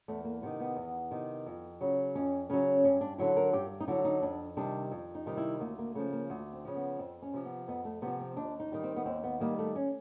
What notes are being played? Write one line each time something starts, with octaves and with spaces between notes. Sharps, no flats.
E2 A3
A#3
C3 D#3 B3
B3
E2
C3 D#3
F2
C#3 F#3
F2 C#4
C#3 F#3 C#4
G2 C#4
D4
D3 F#3 E4
A#4
G2 G4
D#4
D3 F#3 E4
D#4
F2 D4
C3 D#3 G3 D4
F2
D#4
C3 D#3 G3
E4
D2 A#3
A#3
C#3 F3 A3
A#3
D2
C4
C#3 F3
B3
F2 C4
C#4
C3 F3
B3
F2 B3
A3
C3 F3 B3
C4
D#2 D4
D#4
D#3 G3
C4
B3
D#2 C4
B3
D#3 G3 A#3
A3
C#4